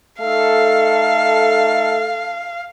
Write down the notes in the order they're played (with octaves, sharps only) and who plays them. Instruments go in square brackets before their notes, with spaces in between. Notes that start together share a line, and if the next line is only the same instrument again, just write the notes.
[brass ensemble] A3 D#4 A4 [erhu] F5